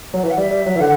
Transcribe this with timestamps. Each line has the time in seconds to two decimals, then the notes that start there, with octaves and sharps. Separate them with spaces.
0.14 F#3
0.23 E3 E5
0.30 F#5
0.37 G3 E5
0.51 G3
0.66 F#3
0.76 E3
0.80 D3 F#5